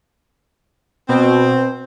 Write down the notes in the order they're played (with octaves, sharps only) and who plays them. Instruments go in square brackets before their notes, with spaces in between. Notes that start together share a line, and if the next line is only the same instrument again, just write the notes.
[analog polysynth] B2 [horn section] C4